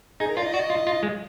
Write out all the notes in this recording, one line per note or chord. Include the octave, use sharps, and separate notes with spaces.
D#4 G#4
A#4
F4 D5
D#5
F#4 D5
D#5
F4
F4
G#3